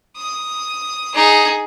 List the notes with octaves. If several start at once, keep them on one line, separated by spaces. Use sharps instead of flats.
D#6
D#4 G#4